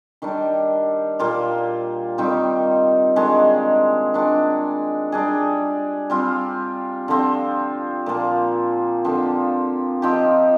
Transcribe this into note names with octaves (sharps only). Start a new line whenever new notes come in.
D#3 G3 D4
A#2 G3 A#3 F4
D#3 G3 C4 D#4
D#3 G#3 D4 G#4
D#3 G#3 D4
G3 D4 G#4
G3 C4 F4
D3 F3 C4
A#2 F3 A#3
D3 F3 C4
F3 C4 D#4 G4